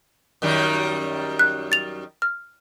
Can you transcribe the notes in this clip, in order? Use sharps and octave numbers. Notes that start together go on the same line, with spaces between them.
F#2 D#3 G3
F#6
A6 F7
F6